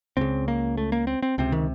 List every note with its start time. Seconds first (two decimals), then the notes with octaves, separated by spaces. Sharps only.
0.17 C#2 C#3 C4
0.48 A#3
0.77 A3
0.92 A#3
1.07 C4
1.22 C4
1.38 C#2 C3 C4
1.52 D#3